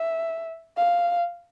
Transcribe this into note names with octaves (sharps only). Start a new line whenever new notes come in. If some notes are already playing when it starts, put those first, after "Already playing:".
Already playing: E5
F5